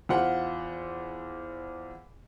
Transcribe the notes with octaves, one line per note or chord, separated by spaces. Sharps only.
E2 F4 C5 F#5